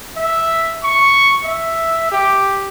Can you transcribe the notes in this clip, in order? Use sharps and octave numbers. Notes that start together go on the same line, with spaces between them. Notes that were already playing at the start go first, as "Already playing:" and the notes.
E5
C#6
E5
G4